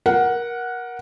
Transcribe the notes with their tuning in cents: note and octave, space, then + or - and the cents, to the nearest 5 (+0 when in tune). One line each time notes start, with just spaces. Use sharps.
A#4 +20 F#5 +0